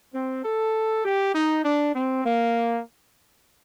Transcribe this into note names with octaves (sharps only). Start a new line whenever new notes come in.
C4
A4
G4
D#4
D4
C4
A#3